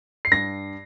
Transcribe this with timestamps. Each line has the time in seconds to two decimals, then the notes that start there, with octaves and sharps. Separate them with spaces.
0.25 C7
0.31 G2 A#6